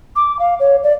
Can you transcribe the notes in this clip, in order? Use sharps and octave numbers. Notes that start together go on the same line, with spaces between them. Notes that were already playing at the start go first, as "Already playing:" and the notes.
D6
F5
C#5
D5